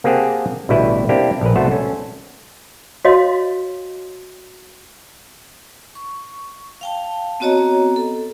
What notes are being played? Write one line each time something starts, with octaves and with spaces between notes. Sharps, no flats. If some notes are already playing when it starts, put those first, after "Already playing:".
A#3 C4 G4 G#4 F#5 A5
A1 B2 D3 G3 E4 B4
A#3 C4 D4 E4 G4
A#1 A#4 B4
C2 A3 B3 F#4 C5 A5
C#4 A4
F#4 C#5 D#5 F5 C6
C#6
F5 G5 A5
B3 C4 F#4 C#5 D#5 A#5
A4